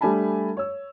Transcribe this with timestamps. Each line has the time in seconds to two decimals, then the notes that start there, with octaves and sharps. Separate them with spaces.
0.01 G3 A3 D4 G#5 A5 B5
0.57 C#5 E6